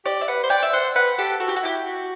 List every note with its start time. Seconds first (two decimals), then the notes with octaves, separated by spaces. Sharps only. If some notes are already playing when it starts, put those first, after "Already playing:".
0.05 G4 D5
0.21 E5
0.28 B4 F#5
0.43 C5
0.50 D5 G5
0.63 E5
0.73 C5 F#5
0.95 B4 F#5
1.18 G4 A4
1.40 F#4 A4
1.48 G4
1.56 F#4
1.62 E4 G4
1.86 F#4